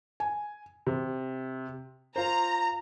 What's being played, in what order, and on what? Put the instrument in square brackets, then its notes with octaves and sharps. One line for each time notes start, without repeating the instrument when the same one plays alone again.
[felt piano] G#5
C3
[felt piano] F4 C5 [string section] A#5